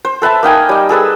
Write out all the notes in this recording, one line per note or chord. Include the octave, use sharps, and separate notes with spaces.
C5
A4 B4 E5 A5
A#3 D#4 G5 G#5
G3 D#5
G#4 A4 B4 E6